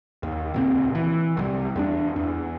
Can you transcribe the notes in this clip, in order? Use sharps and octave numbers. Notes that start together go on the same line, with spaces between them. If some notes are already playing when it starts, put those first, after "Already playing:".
D#2
C#2 A#2 C4
E3
C2 F3 G3
E2 A#3 D4
E2